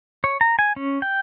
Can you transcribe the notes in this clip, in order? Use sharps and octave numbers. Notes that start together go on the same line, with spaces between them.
C#5
A#5
G#5
C#4
G5